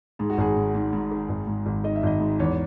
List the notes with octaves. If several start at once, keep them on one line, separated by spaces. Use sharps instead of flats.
G#2 G#4
F#4
G#1 G#4
G#2
G#2
G#2
D#3
G#1
G#2
G#1
D#3 D#5
E5
G#1 D#5
G#2
E2 C#5